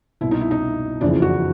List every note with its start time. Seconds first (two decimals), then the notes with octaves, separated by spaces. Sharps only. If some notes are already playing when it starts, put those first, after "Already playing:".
0.21 C2 B2 E4
0.31 D#4
0.41 E4
0.51 D#4
1.01 F#1 F2 C#3 E3 D4
1.22 F#4